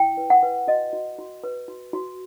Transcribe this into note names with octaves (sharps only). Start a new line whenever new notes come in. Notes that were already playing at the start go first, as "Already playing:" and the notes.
Already playing: E4 G5
B4
F#5
B4
F#4 D#5
F#4
F#4
B4
F#4
F#4